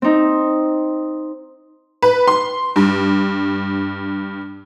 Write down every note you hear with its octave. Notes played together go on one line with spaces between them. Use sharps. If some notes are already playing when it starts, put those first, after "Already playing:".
C4 D#4
B4
C6
G2